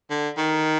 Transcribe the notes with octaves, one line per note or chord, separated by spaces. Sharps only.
D3
D#3